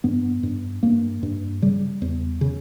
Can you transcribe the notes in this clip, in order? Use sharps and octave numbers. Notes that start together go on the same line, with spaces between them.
G2 B3
G2
G2 A#3
G2
C#3 G3
E2
C#3